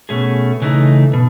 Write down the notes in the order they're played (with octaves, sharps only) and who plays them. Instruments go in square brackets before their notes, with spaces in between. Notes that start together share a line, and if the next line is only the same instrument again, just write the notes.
[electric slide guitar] B2 A3 C#4 G#4
C#3 E3 A3 D#4
B2